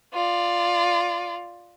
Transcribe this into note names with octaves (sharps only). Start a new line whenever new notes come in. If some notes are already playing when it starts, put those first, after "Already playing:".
F4 D5